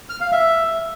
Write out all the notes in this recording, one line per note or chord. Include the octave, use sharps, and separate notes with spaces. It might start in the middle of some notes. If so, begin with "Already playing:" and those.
F6
F5
E5